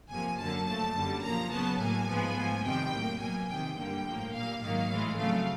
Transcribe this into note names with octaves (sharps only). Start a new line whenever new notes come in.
F2 C3 F3 A#3 G#5
F#2 D3 F#3 A#3 A5
A#2 F3 A3 A5
F#2 D3 G3
A#2 F3 A#3 A#5
C#3 F#3 B3 A5
A2 F#3 A#3 G#5
G#2 F3 G#3 B3
G#2 F3 A3
F2 C3 D#3 G3 G5
A2 F#3 A#3
B2 F#3 A#3 G#5
F2 C3 D#3 G5
G2 D3 G3 A#3 G5
A2 F3 A#3
A#2 G3 A#3 F5
G#2 D#3 F#3 A#3 F5
A2 E3 G#3
F2 C#3 F#3 A3 F5